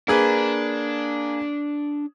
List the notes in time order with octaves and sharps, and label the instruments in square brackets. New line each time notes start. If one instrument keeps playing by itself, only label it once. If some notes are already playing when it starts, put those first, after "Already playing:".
[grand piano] A#3 G#4 B4 [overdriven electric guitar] D4